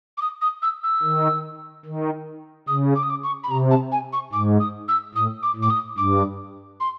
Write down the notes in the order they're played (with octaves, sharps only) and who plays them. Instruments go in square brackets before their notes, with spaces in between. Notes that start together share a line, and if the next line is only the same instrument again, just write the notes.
[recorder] D6
D#6
D#6
E6
E6
[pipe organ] D#3
D#3
[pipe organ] C#3 [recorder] D#6
[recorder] D6
D#6
D6
C#6
B5
[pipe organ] C3 [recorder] A#5
[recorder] A5
G#5
C#6
[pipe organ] G#2 [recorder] D6
[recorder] D#6
E6
[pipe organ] A2 [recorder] D#6
[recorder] D6
[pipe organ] A2
[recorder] D6
D#6
[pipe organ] G2 [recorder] D6
[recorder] C6